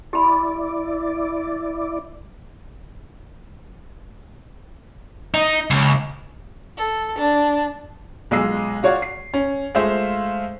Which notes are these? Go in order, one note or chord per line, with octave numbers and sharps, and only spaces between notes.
E4 G4 D5 B5
D#4
C#2
A4
D4 A5
B1 G#3 F4 D#5 E6 C7
F4 F#4 C#5 D5 F5 F#5
C7
C#4
G#3 A3 F4 C5 E5 F5